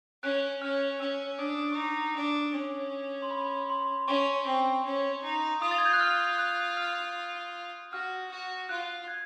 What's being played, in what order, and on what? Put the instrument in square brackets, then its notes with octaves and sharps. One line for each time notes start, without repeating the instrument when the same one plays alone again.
[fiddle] C#4 [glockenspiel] F#6
[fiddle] C#4 [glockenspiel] F6
[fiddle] C#4 [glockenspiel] E6
[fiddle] D4 [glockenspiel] D#6
[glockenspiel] C#6
[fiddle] D#4 [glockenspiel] D6
[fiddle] D4
C#4
[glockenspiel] C6
B5
C6
[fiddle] C#4 [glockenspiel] C#6
[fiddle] C4 [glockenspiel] C#6
[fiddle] C#4
D#4
[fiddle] F4 [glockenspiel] D#6
[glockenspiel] A6
G#6
G6
F#6
F6
F#6
F6
[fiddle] F#4 [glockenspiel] F6
[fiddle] F#4
[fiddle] F4 [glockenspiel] F#6
[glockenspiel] F#6 G#6